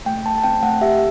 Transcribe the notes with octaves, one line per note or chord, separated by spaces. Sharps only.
A3 G5
A3 A5
A5
C4 G5
A3 F#5
G4 E5